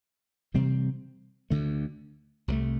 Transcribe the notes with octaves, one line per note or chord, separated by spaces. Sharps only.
C3 E3 G3 C4
D2 D3 A3
C2 C3 F3 A3